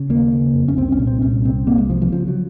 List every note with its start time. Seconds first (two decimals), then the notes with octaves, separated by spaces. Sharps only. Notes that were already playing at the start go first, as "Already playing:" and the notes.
Already playing: C#3
0.09 D#2 A#3
0.32 C#3
0.54 F2
0.68 C#4
0.77 C2 C4
0.92 C#4
0.99 A#2
1.07 C4
1.22 C2 C#4
1.45 C3 C4
1.67 C2 A#3
1.78 G#3
1.90 C3 F3
2.02 F3
2.12 C#3 F3
2.28 F#3